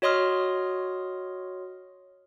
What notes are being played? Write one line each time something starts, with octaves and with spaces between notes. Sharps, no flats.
F#4 C#5 D#5 C6 D#6 F6